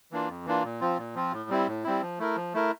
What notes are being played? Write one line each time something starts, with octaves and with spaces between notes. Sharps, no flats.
E3 A#3 D4 F4
F2
E3 A#3 D4 F4
A#2
F3 C4 F4
A#2
F3 C4 F4
A2
G3 C4 E4
A2
G3 C4 E4
F3
A3 E4 A#4
F3
A3 E4 A#4